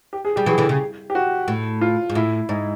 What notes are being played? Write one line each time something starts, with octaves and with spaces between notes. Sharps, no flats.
G4
G#4
G3 G4
E3 F#3 G#4
D3 E3
C#3
G4
F#4
A2
F4
G#2
A2 E4
G#2 D#4